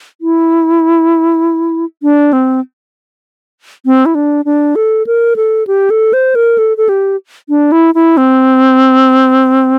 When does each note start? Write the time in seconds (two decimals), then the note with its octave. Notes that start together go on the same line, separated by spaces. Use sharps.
0.21 E4
2.03 D4
2.33 C4
3.86 C4
4.06 E4
4.15 D4
4.45 D4
4.76 A4
5.07 A#4
5.36 A4
5.67 G4
5.90 A4
6.13 C5
6.35 A#4
6.58 A4
6.77 A4
6.89 G4
7.49 D4
7.72 E4
7.95 E4
8.17 C4